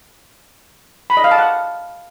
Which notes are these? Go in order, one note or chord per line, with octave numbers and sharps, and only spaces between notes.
B5
D#5
F5
A5
F#5